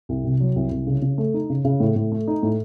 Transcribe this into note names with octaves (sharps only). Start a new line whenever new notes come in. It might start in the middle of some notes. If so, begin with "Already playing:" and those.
C2
C3
F#3
C2
C2
C#3
C#3
A3
D#4
C#3
C#3
A2
A2
A3
D#4
A2